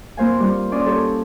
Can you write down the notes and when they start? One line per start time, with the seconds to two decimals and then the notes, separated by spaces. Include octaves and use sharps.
0.17 F2 A#3 C5 F5 G#5
0.40 G3 C4 F4
0.71 C#4 D5 C6 D#6
0.86 G4 A4 C#5